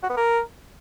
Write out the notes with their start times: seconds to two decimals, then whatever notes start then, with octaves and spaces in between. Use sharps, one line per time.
0.03 F#4
0.10 B3
0.17 A#4